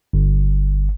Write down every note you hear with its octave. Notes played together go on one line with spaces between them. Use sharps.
G1